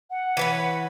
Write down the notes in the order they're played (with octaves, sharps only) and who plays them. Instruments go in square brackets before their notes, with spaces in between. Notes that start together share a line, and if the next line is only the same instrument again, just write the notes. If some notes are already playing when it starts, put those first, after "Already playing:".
[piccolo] F#5
[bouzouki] E3 B4 C#5